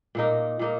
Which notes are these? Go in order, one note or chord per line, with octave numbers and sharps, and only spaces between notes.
A#2 A#3 D#4 A#4
A#2 A#3 D#4 A#4